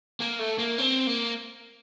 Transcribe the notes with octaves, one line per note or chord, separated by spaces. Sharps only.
A#3
A3
A#3
C4
A#3